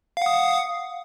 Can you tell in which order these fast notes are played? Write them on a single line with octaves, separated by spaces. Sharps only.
F5 F#5 D#6